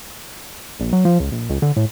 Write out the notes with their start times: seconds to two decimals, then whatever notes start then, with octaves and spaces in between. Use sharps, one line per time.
0.80 A#1
0.93 F#3
1.05 F3
1.20 C#2
1.32 A#1
1.49 C#2
1.62 D3
1.77 A2